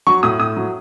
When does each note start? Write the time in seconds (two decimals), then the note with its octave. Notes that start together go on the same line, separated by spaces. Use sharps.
0.07 F#3 C#6
0.23 A2 D#6
0.40 A2 D#6
0.57 F#3